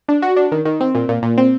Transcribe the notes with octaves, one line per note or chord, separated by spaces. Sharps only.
D4
F#4
D4
D#3
D#3
C4
A#2
A#2
A#2
C4